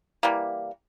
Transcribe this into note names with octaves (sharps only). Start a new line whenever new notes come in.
E3 G3 A#3